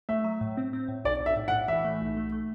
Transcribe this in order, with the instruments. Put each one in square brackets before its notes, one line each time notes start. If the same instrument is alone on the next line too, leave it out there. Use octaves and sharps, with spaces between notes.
[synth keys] A3 [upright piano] E5
[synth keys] F#3
A2
C4
C4
A2
[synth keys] B1 [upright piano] D5
[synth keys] B1
[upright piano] E5
[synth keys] A2
[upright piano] F#5
[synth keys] A2
[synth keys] E3 [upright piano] E5
[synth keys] A3
B1
A3
A3